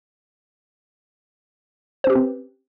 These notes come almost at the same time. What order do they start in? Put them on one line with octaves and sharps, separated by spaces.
C5 C#4 G4 B4 C4